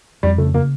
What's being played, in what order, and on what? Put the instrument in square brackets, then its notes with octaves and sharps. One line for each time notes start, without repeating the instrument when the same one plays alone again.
[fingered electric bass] F2 [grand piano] G3
[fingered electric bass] C#3 [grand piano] A3
[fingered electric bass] C#3 [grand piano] A#3